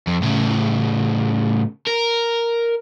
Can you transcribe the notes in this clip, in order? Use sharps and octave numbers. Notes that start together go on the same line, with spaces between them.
F2
A2 C#3
A#4